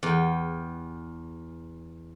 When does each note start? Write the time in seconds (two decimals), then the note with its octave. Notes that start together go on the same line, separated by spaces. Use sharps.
0.03 E2 G5